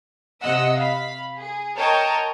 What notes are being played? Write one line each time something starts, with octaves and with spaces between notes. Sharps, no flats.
C3 D#5 F#5 E6
F5 B5
G#4
A#4 C#5 D#5 G5 A5